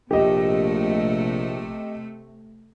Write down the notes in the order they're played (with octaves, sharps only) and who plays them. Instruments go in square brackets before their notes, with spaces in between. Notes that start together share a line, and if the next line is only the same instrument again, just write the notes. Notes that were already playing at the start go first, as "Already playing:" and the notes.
[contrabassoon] A#1 [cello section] C3 A3 [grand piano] G4 D#5